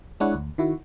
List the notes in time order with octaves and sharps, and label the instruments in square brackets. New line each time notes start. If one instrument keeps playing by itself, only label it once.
[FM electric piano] G#3 D4 E4 C#5 F#5
D2
D#3 E4 F#4